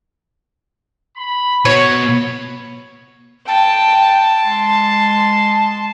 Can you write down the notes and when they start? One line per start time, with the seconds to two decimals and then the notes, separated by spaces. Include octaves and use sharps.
1.16 B5
1.65 B2 C#5
3.48 G5 A5
4.45 G#3 C6